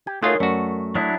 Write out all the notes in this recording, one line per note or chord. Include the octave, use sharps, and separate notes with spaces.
G4 G#6
A3 D#4 F4 F#4 G#4 A#4 C#5 C6
F#2 A3 F#4 D5 F#5
F#3 D4 E4 D#6